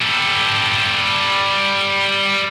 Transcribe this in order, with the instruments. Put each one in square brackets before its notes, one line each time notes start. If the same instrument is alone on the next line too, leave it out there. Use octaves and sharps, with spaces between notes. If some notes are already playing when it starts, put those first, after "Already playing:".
[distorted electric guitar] G3 A4